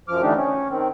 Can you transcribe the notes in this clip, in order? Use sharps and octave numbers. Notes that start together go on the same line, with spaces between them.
F#2 F3 D6 F6
D3 E3 A3 D4 D#4 G4
C#4
D#3 C4